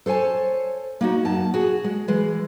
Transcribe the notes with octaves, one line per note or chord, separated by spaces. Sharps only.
A4 C5 C#5 G#5 A5
A#3 D#4 F#4
F#2 A5
F#4 G#4
G#3
E3 G#3